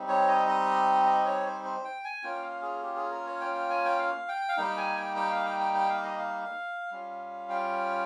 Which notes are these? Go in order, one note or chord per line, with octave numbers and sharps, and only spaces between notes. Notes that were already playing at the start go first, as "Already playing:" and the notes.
Already playing: G3 C4 D#4
C#5
D#5
D#5
D#5
C#5
C5
C5
G5
G#5
A#3 C#4 F4 G5
F5
G#4
G4
G#4
A#4
C#5
G5
G5
G#5
G5
F5
G5
F5
G3 A#3 D#4 G5
G#5
G5
G5
F5
G5
G5
G5
F5
D#5
F5
G3 C#4 F4
G5